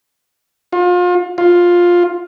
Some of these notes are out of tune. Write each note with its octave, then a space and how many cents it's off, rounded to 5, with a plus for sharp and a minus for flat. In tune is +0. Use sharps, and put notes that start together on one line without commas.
F4 +35
F4 +10